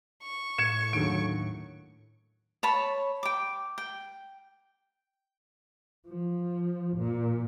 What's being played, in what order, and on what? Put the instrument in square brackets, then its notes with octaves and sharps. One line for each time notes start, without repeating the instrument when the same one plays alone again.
[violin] C#6
[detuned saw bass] A2 [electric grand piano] G#6 C#7 E7
[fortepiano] D#2 D3 F#3 [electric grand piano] D7
[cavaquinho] C#5 A5 B5
G5 D6
G5
[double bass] F3
A#2